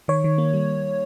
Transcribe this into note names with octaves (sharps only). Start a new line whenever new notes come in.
D#3 C#5
D#3
A#3
G3